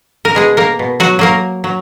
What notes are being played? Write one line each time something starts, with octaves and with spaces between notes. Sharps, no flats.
A#4
B2 G#3 G#4
A#3 A#4
B2
F#3 F#4
F#3 A#3 A#4
F#3